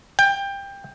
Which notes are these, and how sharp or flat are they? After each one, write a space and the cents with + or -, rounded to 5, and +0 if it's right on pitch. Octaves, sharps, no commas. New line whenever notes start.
G5 +20